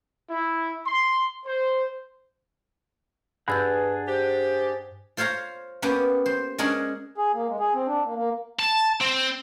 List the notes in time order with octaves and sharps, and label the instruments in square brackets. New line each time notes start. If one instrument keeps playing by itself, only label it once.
[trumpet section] E4
C6
C5
[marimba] G2 E6 G6 [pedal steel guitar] D4 G#4 F#5 [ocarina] B4
[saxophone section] G4 [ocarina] C5
[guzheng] F4 C5 C#5 F5 A#5
A#3 B3 C#4 G4 B4
C5
G#3 C#4 D4 G#4 A#4 F#5
[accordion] G#4
A#3
G#3
G#4
C4
D4
A#3
A#3
[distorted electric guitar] A5
C4